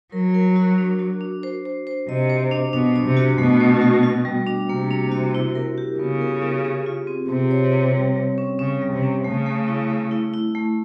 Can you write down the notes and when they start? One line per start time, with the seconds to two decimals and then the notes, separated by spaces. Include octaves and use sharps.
0.12 F#3 A#4
0.34 A#4
0.56 F#4
0.78 D4
0.99 F#4
1.21 D4
1.43 C5
1.65 C5
1.87 C5
2.08 C3 D#5
2.30 C5
2.51 D4
2.73 B2 D4
2.96 D4
3.06 C3
3.17 F#4
3.38 B2 A3
3.60 A3
3.82 F#4
4.03 F#4
4.25 G3
4.47 D4
4.69 C3 A#3
4.91 D4
5.12 F#4
5.35 E4
5.55 A#4
5.78 G4
5.99 C#3 B3
6.21 A#4
6.42 G4
6.65 G#4
6.86 F4
7.07 C4
7.29 C3 C4
7.51 C#5
7.72 C4
7.95 G3
8.16 G3
8.38 C#4
8.59 C#3 C#4
8.82 G3
8.92 C3
9.03 C#4
9.25 C#3 A3
9.46 A3
9.68 E4
9.90 A3
10.11 E4
10.34 E4
10.55 A3